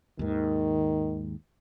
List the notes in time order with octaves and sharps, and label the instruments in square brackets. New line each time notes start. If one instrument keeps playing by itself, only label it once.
[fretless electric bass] D#2 G#2 [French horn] D#3